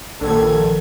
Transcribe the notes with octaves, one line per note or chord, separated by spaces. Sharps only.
A#1 D#3 A4 G#6